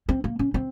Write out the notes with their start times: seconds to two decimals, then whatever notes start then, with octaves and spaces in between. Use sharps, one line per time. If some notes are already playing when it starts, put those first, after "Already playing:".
0.09 C4
0.24 A#3
0.39 C#4
0.54 C4